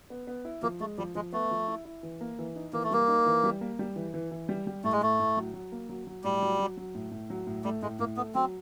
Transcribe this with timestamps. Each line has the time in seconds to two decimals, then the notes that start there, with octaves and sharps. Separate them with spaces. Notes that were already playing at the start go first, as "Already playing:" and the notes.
0.10 B3
0.27 B3
0.45 E4
0.62 F3 A#3
0.80 G#3 A3
0.98 F3 G3
1.15 F3 G#3
1.33 A3 B3
1.51 F3
1.68 E4
1.85 E4
2.03 E3
2.21 A#3
2.39 E3
2.56 D#4
2.73 E3 A#3
2.83 A3
2.91 G3 A#3
3.08 D#4
3.26 E3
3.44 G3
3.61 A#3
3.79 G3
3.96 E3
4.14 E3
4.31 E3
4.49 G3
4.67 G3
4.84 A2 A3
4.92 G#3
5.01 A2 A3
5.20 A2
5.37 F#3
5.54 F#3
5.72 A#3
5.89 F#3
6.07 F#3
6.24 A2 G3
6.42 F#3
6.59 F#3
6.77 F#3
6.95 A2
7.11 A2
7.30 F#3
7.47 A2
7.64 G3 A3
7.82 A2 G#3
7.99 A2 A#3
8.17 A3 B3
8.35 F#3 C4